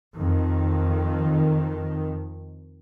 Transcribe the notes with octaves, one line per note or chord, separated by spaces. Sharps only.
F2 D#3